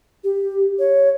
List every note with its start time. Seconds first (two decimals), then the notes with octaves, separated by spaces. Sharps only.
0.24 G4
0.79 C#5